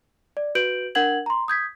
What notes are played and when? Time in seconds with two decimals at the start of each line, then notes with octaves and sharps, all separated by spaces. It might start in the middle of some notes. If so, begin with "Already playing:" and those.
0.37 D5
0.55 F#4 B4 G6 D7 F#7
0.95 D4 A#4 F#5 G#6 F#7
1.26 A#5 C6
1.48 D#6 G6 G#6 B6